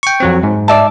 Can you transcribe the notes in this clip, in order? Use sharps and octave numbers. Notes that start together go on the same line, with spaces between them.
G5 C#6
F2 F#3 C4
G#2
D5 E5 A5